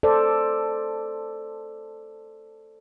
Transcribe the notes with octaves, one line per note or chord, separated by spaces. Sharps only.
A4 C5 D5